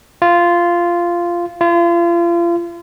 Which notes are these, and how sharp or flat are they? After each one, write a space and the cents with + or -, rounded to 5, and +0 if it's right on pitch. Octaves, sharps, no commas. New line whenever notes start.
F4 -10
F4 -35